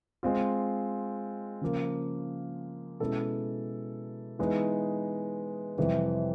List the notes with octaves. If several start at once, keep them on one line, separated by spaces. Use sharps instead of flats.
G#3 C4 F4
C#3 F3 A#3
B2 G#3 C#4 E4 A4
E3 G#3 B3 D#4
F2 C3 E3 G3